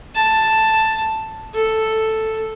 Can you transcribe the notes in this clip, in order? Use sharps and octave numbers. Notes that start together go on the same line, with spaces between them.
A5
A4